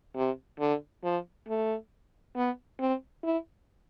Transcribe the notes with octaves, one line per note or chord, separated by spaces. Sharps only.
C3
D3
F3
A3
B3
C4
E4